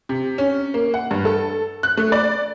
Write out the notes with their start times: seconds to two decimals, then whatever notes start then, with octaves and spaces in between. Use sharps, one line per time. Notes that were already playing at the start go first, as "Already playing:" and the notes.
0.09 C3
0.38 C#4
0.74 A#3
0.94 F#5
1.11 G2
1.25 A4
1.83 F#6
1.97 A3
2.12 D5